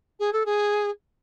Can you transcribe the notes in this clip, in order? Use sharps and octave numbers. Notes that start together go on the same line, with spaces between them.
G#4
A4
G#4